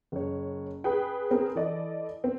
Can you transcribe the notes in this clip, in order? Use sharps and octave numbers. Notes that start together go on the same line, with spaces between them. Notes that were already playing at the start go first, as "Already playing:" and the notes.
F#1 C#5
G#4 B4 G5
C4 G#4 A#4 B4
E3 A4 D5 D#5
C4